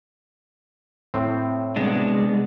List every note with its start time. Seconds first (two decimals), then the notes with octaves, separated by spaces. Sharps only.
1.14 A2 C4
1.76 C2 G#3 B3 D4